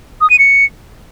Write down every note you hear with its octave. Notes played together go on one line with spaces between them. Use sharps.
D#6
D#7
C#7